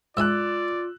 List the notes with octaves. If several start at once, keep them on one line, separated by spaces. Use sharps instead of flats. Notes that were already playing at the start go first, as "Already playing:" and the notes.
G#2 F4 D5 E5 G#5 E6 F#6